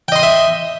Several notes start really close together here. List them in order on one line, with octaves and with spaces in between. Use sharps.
G5 D#5 C6 D#6 E5